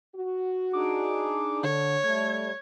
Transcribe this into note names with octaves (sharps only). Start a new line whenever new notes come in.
F#4
D4 D#4 G#4 D6
D3 C#5
G3 A3 G#6